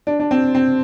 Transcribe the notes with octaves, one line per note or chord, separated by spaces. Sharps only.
D4
D4
C4
C4